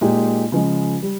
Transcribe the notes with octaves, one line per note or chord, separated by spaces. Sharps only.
A#2 G#3 D#4 G4
C#3 F3 G#3
G3